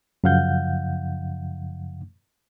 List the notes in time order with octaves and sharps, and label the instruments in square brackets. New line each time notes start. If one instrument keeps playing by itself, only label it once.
[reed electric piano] F#2 C#3 F3 F5 F#5 G6